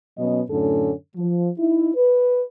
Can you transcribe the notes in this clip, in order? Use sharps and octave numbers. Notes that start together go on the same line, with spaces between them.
B2 F#3 B3 C#4 D#5
F#2 A2 D3 C#4 A4
F3
D#4 E4
B4